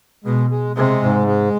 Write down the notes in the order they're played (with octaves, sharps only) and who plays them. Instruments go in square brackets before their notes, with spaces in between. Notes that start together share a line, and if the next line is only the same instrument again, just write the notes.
[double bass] B2 [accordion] G#3
[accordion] G#3
[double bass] C3 [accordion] G#3
[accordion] G#2
G#3